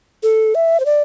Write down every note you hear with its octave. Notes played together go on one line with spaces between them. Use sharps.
A4
E5
C5
D5